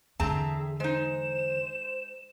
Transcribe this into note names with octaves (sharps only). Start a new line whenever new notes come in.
E2 D3 C4 G#4 E5 A5 A#5
G#3 D#4 C5 E7